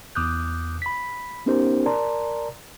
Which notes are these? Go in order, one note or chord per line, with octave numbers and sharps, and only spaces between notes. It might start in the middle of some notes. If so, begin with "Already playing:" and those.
E2 D6 D#6 F#6 G6
B5 B6
B3 C#4 D#4 G4 A#4 C5
A#4 D5 A5 A#5 C6